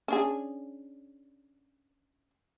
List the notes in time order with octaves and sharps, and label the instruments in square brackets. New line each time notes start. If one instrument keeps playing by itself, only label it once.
[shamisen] C#4 D4 G#4